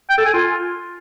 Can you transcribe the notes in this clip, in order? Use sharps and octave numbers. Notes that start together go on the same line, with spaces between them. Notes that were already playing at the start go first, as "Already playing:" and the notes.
G5
A4
G#5
F4